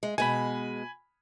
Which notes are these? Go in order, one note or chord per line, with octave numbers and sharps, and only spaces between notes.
G#3
B2 G#3 G#5 B5